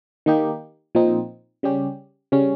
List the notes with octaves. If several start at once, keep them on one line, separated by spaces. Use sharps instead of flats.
D#3 A#3 D#4 G4
A#2 F3 C4 D#4
C#3 G3 C#4 G4
C#3 G3 C#4